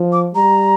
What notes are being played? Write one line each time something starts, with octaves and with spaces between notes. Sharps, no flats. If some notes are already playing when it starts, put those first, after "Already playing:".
Already playing: F3
D6
G3 A#5